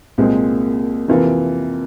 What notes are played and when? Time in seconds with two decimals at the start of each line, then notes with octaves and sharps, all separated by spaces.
0.18 C2 A#2 G#3 C4
1.08 F2 C3 E3 A#3 F4